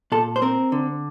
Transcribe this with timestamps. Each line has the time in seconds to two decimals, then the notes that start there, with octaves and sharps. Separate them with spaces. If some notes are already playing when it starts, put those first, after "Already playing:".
0.12 A#2 A4
0.36 C5
0.42 C4 A#4
0.72 D3